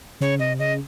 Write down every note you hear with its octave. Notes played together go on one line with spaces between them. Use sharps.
C#3 C#5
C3 D#5
C#3 D#5